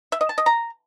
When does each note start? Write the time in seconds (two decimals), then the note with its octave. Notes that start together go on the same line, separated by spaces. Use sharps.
0.12 E5
0.21 D#5
0.29 A5
0.38 D#5
0.46 A#5